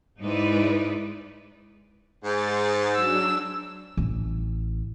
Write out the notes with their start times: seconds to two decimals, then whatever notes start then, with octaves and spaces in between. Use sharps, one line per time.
0.21 G#2 G#3 D#4 E4 B4 D5
2.24 G#2 G#4 A6
2.95 F#3 D4 E6
3.97 A1